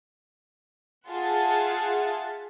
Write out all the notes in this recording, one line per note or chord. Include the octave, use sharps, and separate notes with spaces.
F4 G#4 E5 F#5 A5 A6